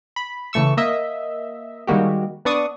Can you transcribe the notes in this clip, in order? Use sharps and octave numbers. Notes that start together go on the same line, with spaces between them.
B5
C#3 E3 A3 C#6 E6
A#3 D#5 E5
D#3 G3 G#3 A#3 F#4 G4
B3 D4 D5 C#6 D#6